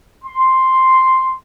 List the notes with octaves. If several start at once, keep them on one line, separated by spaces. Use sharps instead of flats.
C6